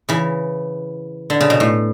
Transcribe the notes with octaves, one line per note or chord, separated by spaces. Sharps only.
C#3 E3
D3
C#3
B2
A2